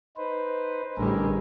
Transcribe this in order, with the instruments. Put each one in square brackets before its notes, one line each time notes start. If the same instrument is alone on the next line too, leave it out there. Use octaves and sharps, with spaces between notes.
[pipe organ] D#4 B4 C5
[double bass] A1 G3 [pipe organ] D3 G#4 A#4